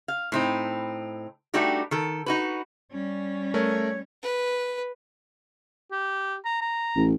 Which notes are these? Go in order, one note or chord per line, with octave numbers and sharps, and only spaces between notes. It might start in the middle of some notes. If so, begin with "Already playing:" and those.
F5
A2 C4 D#4
G3 A3 D4 D#4 F#4 G4
D#3 A4
D#4 F#4 B4
G3 C#4
A3 A#4 C#5
B4
G4
A#5
A#5
A1